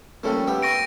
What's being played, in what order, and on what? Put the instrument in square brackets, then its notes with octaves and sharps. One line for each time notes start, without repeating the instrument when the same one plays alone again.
[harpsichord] F3 G3 A3 [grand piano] A#3 C#4 A4
[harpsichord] B3 E5 [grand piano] G4
[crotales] C#6 A#6 D7